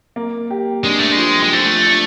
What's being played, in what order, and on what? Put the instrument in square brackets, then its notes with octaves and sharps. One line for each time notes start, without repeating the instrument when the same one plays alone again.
[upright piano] A#3
G4
[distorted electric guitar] G#3 [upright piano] D4
[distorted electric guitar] A3
G#3
[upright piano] F3
[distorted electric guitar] G#3
[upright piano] F3 [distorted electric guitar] A3
[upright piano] D4